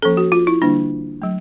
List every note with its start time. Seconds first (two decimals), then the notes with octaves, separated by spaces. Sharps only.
0.02 F3 A#3 C#4 A4
0.17 F#4
0.32 F4
0.47 E4
0.62 D3 G3 A#3 D4
1.22 F#3 A3